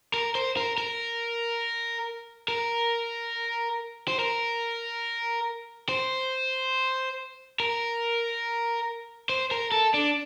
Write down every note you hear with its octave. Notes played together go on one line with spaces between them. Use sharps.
A#4
C5
A#4
A#4
A#4
C5
A#4
C5
A#4
C5
A#4
A4
D4